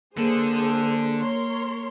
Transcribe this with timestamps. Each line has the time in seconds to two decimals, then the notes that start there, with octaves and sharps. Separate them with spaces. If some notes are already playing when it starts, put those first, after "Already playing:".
0.17 D3 A#3 G#4 A4 C5
1.19 A#4 C#5 C6